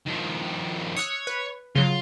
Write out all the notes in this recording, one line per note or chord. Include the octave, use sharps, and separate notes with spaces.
D#3 F3
C#5 D#6 E6 F#6
B4
C#3 F#3 F4